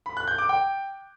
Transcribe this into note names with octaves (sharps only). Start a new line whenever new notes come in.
B5
F#6
G6
D6
G5